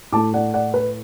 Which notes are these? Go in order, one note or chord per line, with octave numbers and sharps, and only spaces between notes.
A2 A3 A5 D6
D5 F#5
D5 F#5
B4